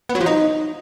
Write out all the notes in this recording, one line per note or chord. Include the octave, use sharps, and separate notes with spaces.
B3
F#3
F3
D#4